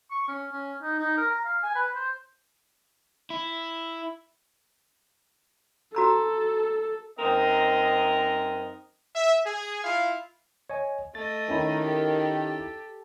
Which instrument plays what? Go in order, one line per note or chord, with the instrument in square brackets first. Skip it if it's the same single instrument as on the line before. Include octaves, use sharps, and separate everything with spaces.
[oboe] C#6
C#4
C#4
D#4
D#4
A#4
A#5
F5
G#5
B4
C5
[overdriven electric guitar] E4
[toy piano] F#4 A#5 E6 [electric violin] A4
[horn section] F#2 C4 D#4 A#4 C5 D#5
[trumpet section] E5
G#4
E4 F4 F5
[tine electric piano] C#5 D#5 G#5
[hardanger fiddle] A3 D#5 [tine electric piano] A6
[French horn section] D#3 [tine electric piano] C#4 E4 A#5
[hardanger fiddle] G4 A4